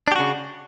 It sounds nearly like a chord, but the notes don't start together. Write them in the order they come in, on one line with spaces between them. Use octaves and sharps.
D4 G4 F#4 C#3